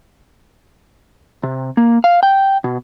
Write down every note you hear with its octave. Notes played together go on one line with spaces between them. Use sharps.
C3
A#3
F5
G5
B2